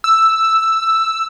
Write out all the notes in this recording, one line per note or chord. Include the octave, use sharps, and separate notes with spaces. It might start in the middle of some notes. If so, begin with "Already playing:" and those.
E6